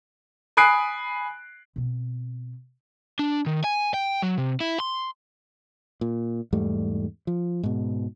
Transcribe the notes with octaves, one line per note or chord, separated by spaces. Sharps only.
G#5 B5 D#6 F#6 C7 D7
B2 C4
D4
D#3
G#5
G5
F#3
C3
E4
C6
A#2
E2 G#2 G3 A3
F3
G#2 B2